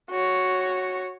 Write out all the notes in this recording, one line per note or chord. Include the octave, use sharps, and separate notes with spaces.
F#4 C#5